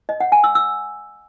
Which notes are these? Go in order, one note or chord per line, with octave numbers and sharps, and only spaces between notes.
D#5
F#5
G#5
E6
E6